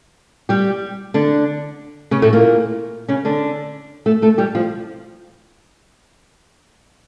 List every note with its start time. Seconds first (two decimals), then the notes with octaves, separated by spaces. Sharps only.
0.49 G3 G4
1.14 D3 D4
2.11 C#3 C#4
2.22 A2 A3
2.33 A#2 A#3
3.08 C#3 C#4
3.25 D3 D4
4.06 A3 A4
4.22 A3 A4
4.38 G3 G4
4.55 F3 F4